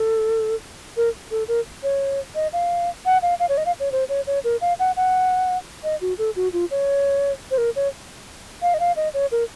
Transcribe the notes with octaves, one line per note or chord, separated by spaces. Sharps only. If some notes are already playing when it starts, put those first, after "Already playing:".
Already playing: A4
A#4
A4
A#4
C#5
D#5
F5
F#5
F5
F5
C#5
D#5
F5
C#5
C5
C#5
C#5
A#4
F5
F#5
F#5
D#5
F#4
A4
F#4
F4
C#5
C5
A#4
C#5
F5
D#5
F5
D#5
C#5
A#4